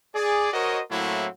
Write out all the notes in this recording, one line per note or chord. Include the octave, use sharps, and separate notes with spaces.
G#4 D5
F#4 A#4 C5 C#5 D#5
A2 F#3 A3 A#3 C4 E4